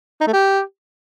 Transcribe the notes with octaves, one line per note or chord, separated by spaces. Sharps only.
D#4
A3
G4